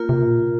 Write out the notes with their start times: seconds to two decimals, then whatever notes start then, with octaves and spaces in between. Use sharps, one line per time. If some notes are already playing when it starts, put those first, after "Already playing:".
Already playing: A#3 F4 A#4
0.09 C3
0.27 A#2